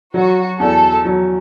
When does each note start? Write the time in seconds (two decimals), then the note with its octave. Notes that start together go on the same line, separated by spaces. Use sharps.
0.14 F#3 F#4
0.60 E2 A4
1.05 F#3